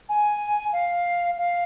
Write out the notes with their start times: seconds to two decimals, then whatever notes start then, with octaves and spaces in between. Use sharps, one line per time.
0.09 G#5
0.73 F5
1.38 F5